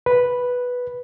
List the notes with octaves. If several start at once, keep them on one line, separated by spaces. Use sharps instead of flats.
B4